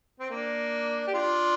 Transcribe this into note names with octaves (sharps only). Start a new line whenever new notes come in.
C4
A#3 D4
G4
D4 F4